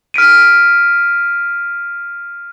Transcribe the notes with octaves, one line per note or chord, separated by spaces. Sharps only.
F6 B6 D7 D#7